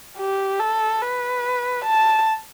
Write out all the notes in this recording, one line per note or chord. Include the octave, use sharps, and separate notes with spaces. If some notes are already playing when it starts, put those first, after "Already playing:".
G4
A4
B4
A5